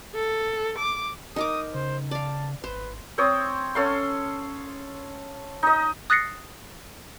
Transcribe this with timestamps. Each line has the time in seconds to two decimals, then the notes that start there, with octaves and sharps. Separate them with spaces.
0.15 A4
0.78 D6
1.36 D#4 A#4 D6 D#6
1.74 C#3 C5
2.11 D5 F5 A5
2.64 G#1 B4 C5
3.18 C4 C5 C#5 D#6
3.75 C#4 A4 F5 C6
5.63 D#4 D#5
6.10 D#6 F#6 A6 A#6 C7 C#7